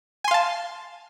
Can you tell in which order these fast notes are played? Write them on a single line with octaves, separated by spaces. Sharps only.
G#5 C6 F5 A5